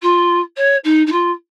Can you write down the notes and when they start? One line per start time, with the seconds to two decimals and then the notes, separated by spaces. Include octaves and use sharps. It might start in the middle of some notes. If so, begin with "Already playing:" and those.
0.02 F4
0.56 C#5
0.84 D#4
1.06 D#4
1.11 F4